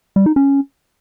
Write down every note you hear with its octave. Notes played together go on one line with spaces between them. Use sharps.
G3
D#4
C#4